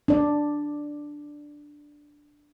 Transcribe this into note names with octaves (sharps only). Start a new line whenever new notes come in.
D4 D5